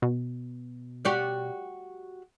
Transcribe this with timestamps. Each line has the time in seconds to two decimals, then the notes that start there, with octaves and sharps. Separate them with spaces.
0.02 B2
1.05 F#4 G4 D5